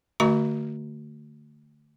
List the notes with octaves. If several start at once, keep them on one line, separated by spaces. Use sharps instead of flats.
D3 A3 F#4 D#5 A#5 C#6